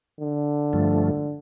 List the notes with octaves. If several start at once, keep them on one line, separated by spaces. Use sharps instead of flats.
D3
G2 F3 A3